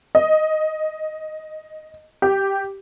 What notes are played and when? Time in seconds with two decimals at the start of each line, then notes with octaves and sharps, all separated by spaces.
0.15 D#5
2.22 G4